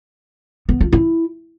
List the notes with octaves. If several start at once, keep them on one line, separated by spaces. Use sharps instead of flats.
B3
F4
E4